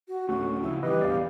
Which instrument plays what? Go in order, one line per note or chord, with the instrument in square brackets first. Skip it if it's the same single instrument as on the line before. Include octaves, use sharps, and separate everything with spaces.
[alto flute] F#4
[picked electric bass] D1 D2 A3 [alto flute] C#4 [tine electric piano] F#4
[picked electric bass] C#3 F3 [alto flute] E4
[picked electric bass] G2 E3 [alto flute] G4 [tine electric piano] B4 D#5
[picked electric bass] A1 E2 B2 [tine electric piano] D5 F5